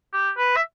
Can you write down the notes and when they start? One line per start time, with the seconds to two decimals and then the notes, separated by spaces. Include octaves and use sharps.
0.13 G4
0.37 B4
0.56 E5